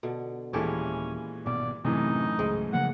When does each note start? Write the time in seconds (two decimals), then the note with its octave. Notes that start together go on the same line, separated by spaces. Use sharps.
0.03 B2 D3
0.53 D#1 A#2 E3 G#3 C#4 E4 G4 A4
1.46 G#1 B2 D5
1.85 F#2 A2 C3 E3 C4 D#4
2.39 C#2 G#2
2.73 C#3 F3 A#3 F#5